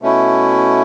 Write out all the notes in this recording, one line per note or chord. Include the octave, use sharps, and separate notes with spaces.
B2 A3 C#4 E4